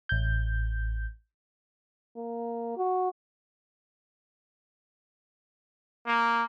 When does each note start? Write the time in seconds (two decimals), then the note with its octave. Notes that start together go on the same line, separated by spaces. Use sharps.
0.09 A1 G6
2.16 A#3
2.77 F#4
6.06 A#3